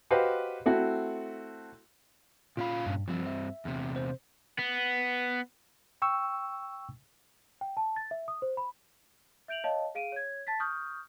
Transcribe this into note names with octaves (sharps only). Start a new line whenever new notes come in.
F#4 G4 B4 C5 D#5 F5
A3 C4 E4 F#4
A#2 C#4 F4 F5 B5
G2
G2 F3 C4
E5
E2 C3
C5
B3
G5 C#6 E6
G5
A5
A6
E5
D#6
C5
B5
E5 G6 D7 F7 F#7
C#5 D#5 F5 A5
G#4 F5 D7 D#7
C#5 G#6
A5 A6 B6
C#6 D#6 F6 G6